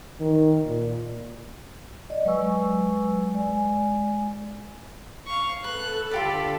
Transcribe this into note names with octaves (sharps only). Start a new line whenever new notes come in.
D#3
A#2
D5 D#5
F#3 G#3 B4 G#5 C#6 E6
G#3 D5 G#5
F5 C#6
A4 B4 F#6
D3 F4 G4 A4 D5 B5